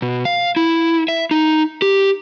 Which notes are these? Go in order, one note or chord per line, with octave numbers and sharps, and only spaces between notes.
B2
F5
E4
E5
D#4
G4